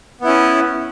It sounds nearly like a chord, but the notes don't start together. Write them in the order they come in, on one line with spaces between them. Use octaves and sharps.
B3 E4 C#4